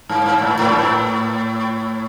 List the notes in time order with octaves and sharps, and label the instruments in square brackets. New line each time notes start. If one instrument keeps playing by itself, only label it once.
[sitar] G#2
G#2
G#2
A2
A2
G#2
A2